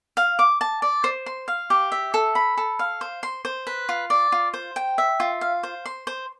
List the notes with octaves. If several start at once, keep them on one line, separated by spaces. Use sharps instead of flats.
F5
D6
A5
D5
C5
C6
F5
G4
E5
A4
B5
A4
F5
C5
C6
C5
B4
F4
D5
F4
C5
G5
E5
F4
F5
C5
C6
C5